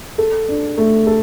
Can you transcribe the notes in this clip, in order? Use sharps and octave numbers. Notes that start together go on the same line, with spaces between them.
A4
D4
A3
A4